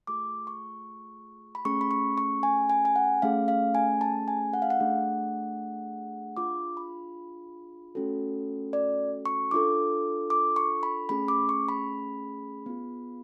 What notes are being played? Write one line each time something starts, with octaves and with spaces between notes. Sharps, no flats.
A3 F4 G#4 D6
C#6
B5
A3 C#4 G#4 C#6
B5
C#6
C#6
G#5
G#5
G#5
F#5
A3 C#4 G#4 F5
F5
G#5
A5
G#5
F#5
F5
F#5
A3 D4 G#4
D4 F4 G#4 D6
B5
A3 C#4 F#4 A4
D5
C#6
D4 F4 A4 D6
D6
C#6
B5
A3 C#4 G#4 B5
D6
C#6
B5
B3 F4 G#4